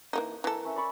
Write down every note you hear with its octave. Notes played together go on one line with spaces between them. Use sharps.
E3 A#3 D#4
E3 A4 A#4
C#4 E5
D5 B5 C#6